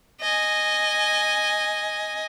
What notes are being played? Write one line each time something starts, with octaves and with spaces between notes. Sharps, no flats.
D#5 G#5